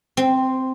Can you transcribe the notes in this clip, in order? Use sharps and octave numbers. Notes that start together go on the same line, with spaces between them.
C4